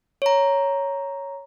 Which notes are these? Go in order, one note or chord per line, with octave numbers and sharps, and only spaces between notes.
C#5 A#5